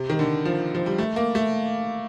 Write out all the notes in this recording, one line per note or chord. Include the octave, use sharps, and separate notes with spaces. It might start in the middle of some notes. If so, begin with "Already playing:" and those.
Already playing: C3
D#3
D3
F3
F3
G3
A3
A#3
A3